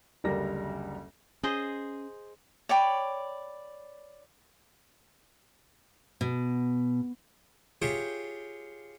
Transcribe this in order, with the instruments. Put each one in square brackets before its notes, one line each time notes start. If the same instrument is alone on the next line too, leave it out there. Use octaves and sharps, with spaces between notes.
[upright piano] F#1 D2 G3 G4 A#4 A#6
[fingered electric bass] C#4 [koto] G#4 C5 D#5
[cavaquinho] C#5 D5 G5 B5
[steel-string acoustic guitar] B2
[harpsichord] F4 G4 G#4 C#5 E5 G5